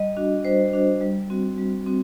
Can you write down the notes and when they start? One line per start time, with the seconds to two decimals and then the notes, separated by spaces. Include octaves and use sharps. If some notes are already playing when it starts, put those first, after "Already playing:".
Already playing: G3 D#5
0.17 D4 F#4
0.45 G3 C5
0.73 D4 F#4
1.01 G3
1.30 C4 F#4
1.58 G3
1.86 C4 F#4